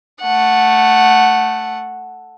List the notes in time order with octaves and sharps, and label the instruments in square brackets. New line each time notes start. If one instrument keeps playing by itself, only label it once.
[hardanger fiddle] A3 F#5